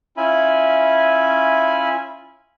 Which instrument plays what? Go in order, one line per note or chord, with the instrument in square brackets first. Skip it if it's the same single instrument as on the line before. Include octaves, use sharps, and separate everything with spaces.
[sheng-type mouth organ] C#4 E4 F4 E5 G#5 B5